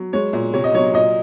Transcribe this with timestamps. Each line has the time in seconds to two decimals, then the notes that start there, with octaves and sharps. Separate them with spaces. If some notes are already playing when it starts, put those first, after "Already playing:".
Already playing: F#3
0.13 G#3 C#5
0.33 A#2
0.53 C3 C#5
0.64 D#5
0.74 F#3 C#5
0.94 A#2 D#5